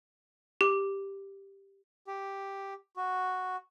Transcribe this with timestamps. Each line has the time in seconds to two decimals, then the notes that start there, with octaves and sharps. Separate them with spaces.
0.61 G4
2.07 G4
2.97 F#4